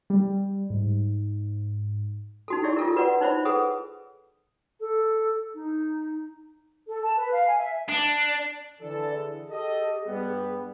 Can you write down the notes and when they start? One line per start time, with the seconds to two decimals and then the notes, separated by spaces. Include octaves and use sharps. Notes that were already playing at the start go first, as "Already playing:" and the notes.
0.10 G3
0.70 G#2
2.48 D#4 F#4 A4
2.63 E4 G4 G#4 C#5 D5 E5
2.77 F4 A4 A#4
2.96 F#4 B4 C#5 D5 F#5
3.21 D#4 C5 C#5 E5 B5
3.45 G#4 A4 B4 F#5 D#6
4.80 A4
5.54 D#4
6.87 A4
7.02 A5
7.17 B4
7.32 F5
7.47 G#5
7.59 E5
7.89 D4
8.81 D3 E3 A4 D5
9.15 G#4
9.50 G4 A4 D#5
10.08 G2 G3 B3